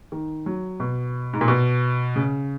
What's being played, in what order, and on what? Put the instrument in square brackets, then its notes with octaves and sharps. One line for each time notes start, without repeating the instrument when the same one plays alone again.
[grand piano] D#3
F#3
B2
G#2
A#2
B2
C#3